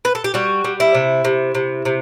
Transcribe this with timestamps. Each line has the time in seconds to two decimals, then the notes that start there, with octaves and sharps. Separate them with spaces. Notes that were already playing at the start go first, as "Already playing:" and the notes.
0.05 B4
0.15 A4
0.24 G4
0.34 G3 F#4
0.64 G3
0.80 E4
0.95 C3
1.24 C3
1.55 C3
1.85 C3